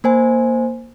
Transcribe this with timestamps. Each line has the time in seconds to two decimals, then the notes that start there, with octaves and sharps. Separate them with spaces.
0.04 A#3 C5 G#5